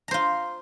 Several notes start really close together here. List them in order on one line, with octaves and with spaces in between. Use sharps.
A#5 C5 F4